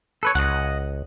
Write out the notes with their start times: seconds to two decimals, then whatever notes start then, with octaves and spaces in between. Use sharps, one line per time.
0.23 A4 B4 C#5
0.35 C#2 D#5 F#5